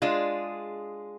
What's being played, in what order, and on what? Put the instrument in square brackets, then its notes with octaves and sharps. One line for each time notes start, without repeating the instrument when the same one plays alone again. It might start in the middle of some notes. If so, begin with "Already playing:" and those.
[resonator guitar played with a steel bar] G#3 D4 F4 G#4